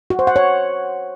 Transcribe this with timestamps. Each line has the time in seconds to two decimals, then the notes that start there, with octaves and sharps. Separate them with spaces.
0.10 F#4
0.19 C5
0.27 F#5
0.36 C#5